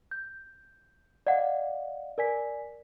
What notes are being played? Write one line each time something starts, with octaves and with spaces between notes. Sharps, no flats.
G6
D5 D#5 F5 F#5
A#4 D5 G#5 B6